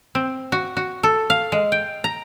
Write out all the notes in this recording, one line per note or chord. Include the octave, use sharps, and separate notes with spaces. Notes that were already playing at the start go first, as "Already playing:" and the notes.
C4
F#4
F#4
A4
F5
G#3
G5
A#5